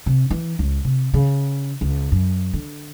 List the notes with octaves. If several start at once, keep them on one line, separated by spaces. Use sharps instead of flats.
C3
E3
C#2
C3
C#3
C#2
F#2
D3